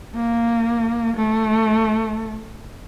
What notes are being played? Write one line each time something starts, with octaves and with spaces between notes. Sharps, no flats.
A#3
A3